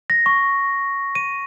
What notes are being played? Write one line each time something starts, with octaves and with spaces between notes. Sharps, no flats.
A#6
C#6
D#7